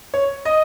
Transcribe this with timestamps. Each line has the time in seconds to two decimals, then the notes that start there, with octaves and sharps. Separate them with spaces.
0.14 C#5
0.45 D#5